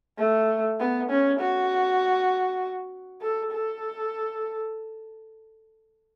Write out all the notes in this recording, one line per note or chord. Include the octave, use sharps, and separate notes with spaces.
A3
B3
C#4
F#4
A4
A4